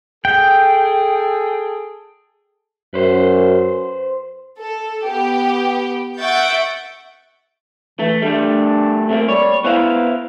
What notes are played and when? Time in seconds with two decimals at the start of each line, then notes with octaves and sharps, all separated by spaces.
0.25 G#4 A4 G5
2.94 F#2 B4 C5
4.60 A4
5.06 B3 G4 G5
6.19 E5 F#5 C#6 G6 A6 D7
7.99 E3 A3
8.22 G3 A3 D4
9.09 C3 A3 A#3
9.29 G3 C#5
9.64 B3 E4 C5 F5